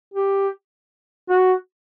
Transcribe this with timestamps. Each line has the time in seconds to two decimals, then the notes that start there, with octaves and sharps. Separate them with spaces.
0.14 G4
1.30 F#4